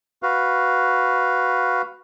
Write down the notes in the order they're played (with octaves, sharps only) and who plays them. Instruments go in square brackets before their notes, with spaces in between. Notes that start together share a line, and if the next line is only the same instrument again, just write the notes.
[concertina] F#4 B4 F5